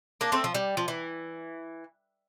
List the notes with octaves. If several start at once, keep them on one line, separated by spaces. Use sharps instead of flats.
A#3 D4
A3 C4
F3
G3
F3
E3